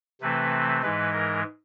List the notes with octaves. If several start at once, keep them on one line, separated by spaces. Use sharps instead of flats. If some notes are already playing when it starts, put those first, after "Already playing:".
C3 E3 A3 C4 B4
G#2 E3 G#3 B4
A#4